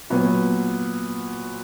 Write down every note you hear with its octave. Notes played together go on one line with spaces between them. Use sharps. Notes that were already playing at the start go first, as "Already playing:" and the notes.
A#2 F#3 B3